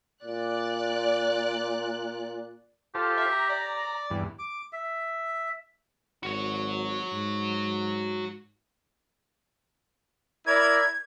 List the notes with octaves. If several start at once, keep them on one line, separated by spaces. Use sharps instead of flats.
A#2 D5 F#6
F4 G4 A4 C5
E5
A#5
D5
E2 G2
D6
E5
G#1 F#4 C#5
G#2
E4 A#4 D5 G#6